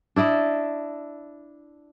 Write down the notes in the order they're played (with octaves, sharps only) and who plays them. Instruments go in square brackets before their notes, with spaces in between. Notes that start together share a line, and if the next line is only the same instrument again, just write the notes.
[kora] D4 E4 D5 D#5